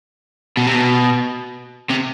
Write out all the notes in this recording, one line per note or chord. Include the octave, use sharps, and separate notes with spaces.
B2
C3
B2
C3